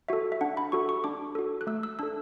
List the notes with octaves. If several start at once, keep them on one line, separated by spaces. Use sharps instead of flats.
F#4 A4 E5
E5
D4 F#5
B5
F#4 A4 C#6
C#6
D4 D6
F#4 A4
F#6
A3 E6
E6
D4 A4 E6